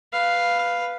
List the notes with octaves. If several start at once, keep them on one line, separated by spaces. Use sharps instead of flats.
B4 F5